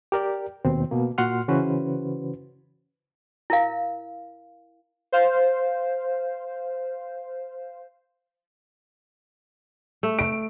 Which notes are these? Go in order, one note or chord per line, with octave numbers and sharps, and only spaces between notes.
G4 A#4 D5
D#2 B2 C4
B2 A#3
A#2 F#4 F#5 C6 F6
C#3 E3 C#4 F#4 B4 C5
E4 A#4 F5
C5 F5
A3
D7